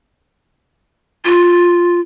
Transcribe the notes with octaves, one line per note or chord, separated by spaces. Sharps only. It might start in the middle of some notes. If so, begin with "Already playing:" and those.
F4